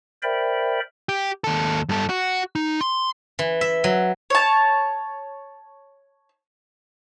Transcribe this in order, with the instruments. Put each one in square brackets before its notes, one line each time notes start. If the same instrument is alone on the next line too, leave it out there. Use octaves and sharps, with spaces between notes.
[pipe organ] A#4 C5 D5 E5 G5 B5
[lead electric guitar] G4
D#2 A4
G2 A4
F#4
D#4
C6
[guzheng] E3
E5
F#3
[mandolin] C#5 A5